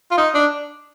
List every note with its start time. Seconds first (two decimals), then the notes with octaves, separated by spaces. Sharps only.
0.11 F4
0.18 D#4
0.35 D4